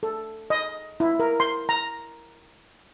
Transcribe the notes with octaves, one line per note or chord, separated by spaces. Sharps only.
A4
D#5
E4
A#4
C6
A#5